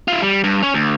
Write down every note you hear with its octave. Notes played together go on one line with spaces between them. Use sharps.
E4 F4
G3
G2
C#4 C#5
D2